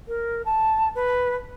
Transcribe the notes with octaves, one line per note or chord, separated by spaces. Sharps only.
A#4
A5
B4